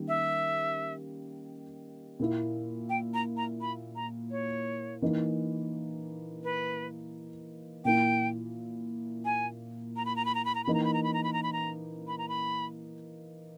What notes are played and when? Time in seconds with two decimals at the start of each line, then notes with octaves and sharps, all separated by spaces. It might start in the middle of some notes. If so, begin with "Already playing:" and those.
Already playing: D#3 G3 A#3 C#4
0.08 E5
2.19 A#2 A#3 E4
2.90 G5
3.14 A#5
3.37 A#5
3.61 B5
3.96 A#5
4.31 C#5
5.02 E3 A#3 D#4
6.44 B4
7.85 A#2 A#3 E4 G5
9.25 G#5
9.96 A#5
10.06 B5
10.16 A#5
10.25 B5
10.35 A#5
10.45 B5
10.55 A#5
10.64 E3 A#3 D#4 B5
10.74 A#5
10.84 B5
10.94 A#5
11.03 B5
11.14 A#5
11.24 B5
11.33 A#5
11.43 B5
11.53 A#5
12.08 B5
12.18 A#5
12.29 B5